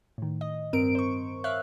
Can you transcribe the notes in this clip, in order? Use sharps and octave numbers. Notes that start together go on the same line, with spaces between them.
A2 D#3
D#5
G2 C4 A#4 D7
C5 C#6
C#5 E5 F5 F#6